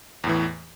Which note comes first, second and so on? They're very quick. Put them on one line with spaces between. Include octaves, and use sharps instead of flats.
E2 A2 E3